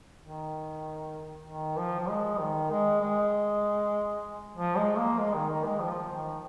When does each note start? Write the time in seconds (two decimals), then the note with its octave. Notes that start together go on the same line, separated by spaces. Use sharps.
0.22 D#3
1.47 D#3
1.78 F3
2.00 F3
2.09 G#3
2.39 D#3
2.70 G#3
3.02 G#3
4.57 F3
4.77 G#3
4.98 A#3
5.18 G#3
5.34 D#3
5.49 D#3
5.65 G#3
5.80 F3
6.12 D#3